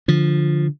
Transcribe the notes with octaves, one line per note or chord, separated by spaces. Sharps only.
D3 F3